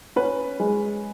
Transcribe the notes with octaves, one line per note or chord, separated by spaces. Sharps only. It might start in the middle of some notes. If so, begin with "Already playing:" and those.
C#4 B4
G#3